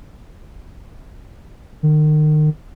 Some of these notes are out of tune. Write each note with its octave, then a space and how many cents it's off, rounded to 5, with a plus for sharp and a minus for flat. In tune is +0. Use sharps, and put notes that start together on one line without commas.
D#3 -35